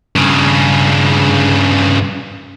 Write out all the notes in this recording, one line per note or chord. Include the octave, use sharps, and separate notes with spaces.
G2 C#3